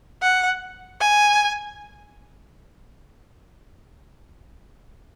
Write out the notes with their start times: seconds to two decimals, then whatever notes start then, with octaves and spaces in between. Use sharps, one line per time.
0.22 F#5
1.00 G#5